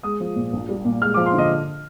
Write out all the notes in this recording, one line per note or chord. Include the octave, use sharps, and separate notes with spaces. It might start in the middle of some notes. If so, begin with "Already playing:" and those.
G#3 D#6
F3
A#2
A#1
G3
A#2
G#3 F6
D6
F3
C6
D3
D#5